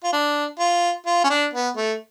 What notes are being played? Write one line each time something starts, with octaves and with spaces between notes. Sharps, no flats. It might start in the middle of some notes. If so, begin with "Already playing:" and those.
F4
D4
F4
F4
C#4
D4
B3
A3